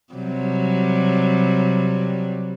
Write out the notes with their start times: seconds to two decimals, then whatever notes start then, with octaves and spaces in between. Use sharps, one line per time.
0.13 C3 F#3 G3